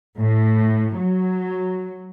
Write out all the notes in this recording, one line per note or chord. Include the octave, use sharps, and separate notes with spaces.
A2
F#3